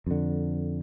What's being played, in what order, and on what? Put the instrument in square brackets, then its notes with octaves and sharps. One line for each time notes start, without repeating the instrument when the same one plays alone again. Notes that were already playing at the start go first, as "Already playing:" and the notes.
[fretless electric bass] F2 D3